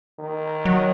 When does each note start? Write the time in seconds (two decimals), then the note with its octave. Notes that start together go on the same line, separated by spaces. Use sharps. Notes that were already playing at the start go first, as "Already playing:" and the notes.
0.19 D#3
0.65 F#3